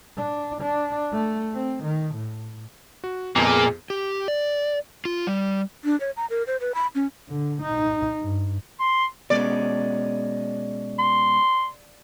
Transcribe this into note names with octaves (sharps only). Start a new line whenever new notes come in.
D4
D4
A3
C4
D#3
A2
F#4
F2 A#2 G#3 A#3 B3 F4
G4
D5
F4
G3
D4
C#5
A#5
A#4
C5
B4
B5
C#4
D3
D#4
G2
C6
B2 G#3 C#4 D5
C6